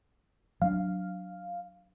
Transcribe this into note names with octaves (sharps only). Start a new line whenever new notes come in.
F#3 C4 D4 F5